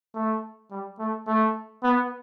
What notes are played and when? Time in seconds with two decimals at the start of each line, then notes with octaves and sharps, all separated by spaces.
0.15 A3
0.71 G3
0.99 A3
1.27 A3
1.83 B3